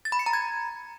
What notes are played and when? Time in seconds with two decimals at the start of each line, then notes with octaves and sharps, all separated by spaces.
0.05 A6
0.12 B5
0.19 C#7
0.26 A#5
0.33 G#6